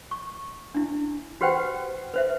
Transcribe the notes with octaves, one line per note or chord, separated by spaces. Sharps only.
C#6
D4 E4
F#4 G4 B4 C5 F#5 G5
B4 C5 E5